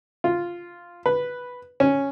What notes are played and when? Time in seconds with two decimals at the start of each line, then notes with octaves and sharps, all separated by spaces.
0.24 F4
1.06 B4
1.80 C#4